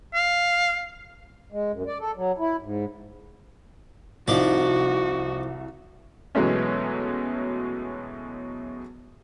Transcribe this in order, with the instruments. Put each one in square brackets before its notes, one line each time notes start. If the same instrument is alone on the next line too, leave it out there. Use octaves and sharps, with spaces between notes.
[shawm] F5
[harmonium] G#3
F#2
D5
A4
F#3
E4
G#2
[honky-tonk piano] C2 [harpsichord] F3 D4 D5 [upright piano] D#4 [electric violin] F#4
[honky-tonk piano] B2 E3 F#3 G#3 A3 C#4